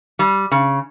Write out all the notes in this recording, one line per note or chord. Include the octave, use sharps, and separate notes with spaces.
G3
C#3